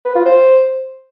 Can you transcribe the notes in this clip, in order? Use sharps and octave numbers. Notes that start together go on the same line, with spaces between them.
B4
F4
C5